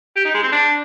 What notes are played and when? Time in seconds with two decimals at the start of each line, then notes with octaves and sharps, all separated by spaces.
0.16 G4
0.25 D#4
0.34 G#3
0.43 C4
0.52 D4